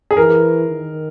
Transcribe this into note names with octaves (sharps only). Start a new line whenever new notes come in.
G#4
E3 A#4
D#3